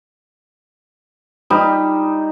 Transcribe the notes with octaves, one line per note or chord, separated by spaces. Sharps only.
G3 D#4